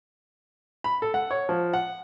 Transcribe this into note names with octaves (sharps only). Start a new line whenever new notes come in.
B5
A4
F#5
C#5
F3
F#5